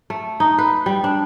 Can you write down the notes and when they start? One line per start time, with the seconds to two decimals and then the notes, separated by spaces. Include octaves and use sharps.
0.10 A3
0.40 D#4
0.58 B4
0.86 G3
1.04 D4